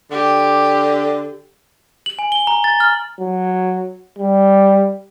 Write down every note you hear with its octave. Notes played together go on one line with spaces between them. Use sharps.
D3 G4
F#7
G#5
G7
A#5
A6
F6
F#3
G3